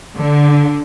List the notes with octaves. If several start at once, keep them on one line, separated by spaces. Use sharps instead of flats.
D3